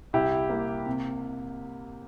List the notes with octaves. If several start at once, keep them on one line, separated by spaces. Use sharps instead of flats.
C2 E4 G4
A#3
C3